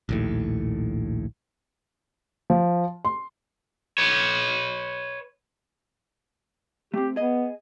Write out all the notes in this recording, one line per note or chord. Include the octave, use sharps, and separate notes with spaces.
A#1 D#2 A2
F3
C6
B4 C#5
A3 C4 G4
B3 G#4 D#5